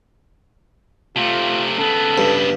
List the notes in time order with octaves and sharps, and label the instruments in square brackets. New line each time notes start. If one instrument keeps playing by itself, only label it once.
[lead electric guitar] C3 A3 [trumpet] F4
[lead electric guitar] C#3 B3 [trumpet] A4
[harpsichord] G2